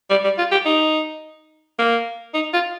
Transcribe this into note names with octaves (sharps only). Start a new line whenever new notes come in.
G3
G3
F4
G4
D#4
A#3
D#4
F4